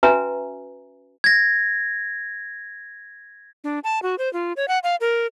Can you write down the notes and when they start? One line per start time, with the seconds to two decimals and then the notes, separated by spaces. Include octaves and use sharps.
0.03 C#4 F#4 B4 E5 G#5 A#5
1.24 G#6 A#6
3.64 D4
3.84 A5
4.02 F#4
4.18 C5
4.33 F4
4.57 C#5
4.68 F#5
4.83 F5
5.01 A#4